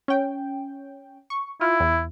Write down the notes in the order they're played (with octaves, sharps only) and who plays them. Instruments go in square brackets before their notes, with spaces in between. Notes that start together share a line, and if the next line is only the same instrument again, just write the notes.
[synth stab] C#4 G5
C#6
[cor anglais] E4 [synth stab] F4
[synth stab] E2